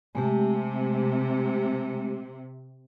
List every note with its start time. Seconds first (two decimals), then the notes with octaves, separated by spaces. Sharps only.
0.15 C3 G#3 A3 G4